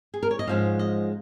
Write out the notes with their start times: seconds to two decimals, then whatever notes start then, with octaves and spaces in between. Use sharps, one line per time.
0.14 G#4
0.23 A#4
0.31 C#5
0.39 D#5
0.47 G#2 F3 G#3 C#4 F5
0.79 D#5